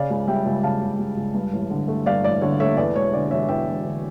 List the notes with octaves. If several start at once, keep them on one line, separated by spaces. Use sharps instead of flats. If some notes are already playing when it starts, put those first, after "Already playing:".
Already playing: C#3 D5 F5
C#2
G3 E5 G5
C#2
C#3 F5 A5
C#2
G3
C#2
G2
A1
D3
A3
G2 D5 F5
A1 D5
D3 C#5
A3 C#5 E5
E2 D5
E1 C#5
D3 D5
E1 C#5 E5
E2 E5 G5
E1
D3